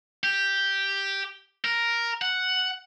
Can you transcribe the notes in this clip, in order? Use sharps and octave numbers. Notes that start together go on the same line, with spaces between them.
G4
A#4
F#5